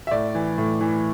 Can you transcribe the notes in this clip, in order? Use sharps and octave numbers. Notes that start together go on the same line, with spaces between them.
E5
A2 D5
E3
A2
E3